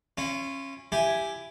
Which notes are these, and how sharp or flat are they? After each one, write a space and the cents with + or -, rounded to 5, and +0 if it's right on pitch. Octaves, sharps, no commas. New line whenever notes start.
C#4 -25 F4 -45
E4 +15 G4 +5 G#5 +0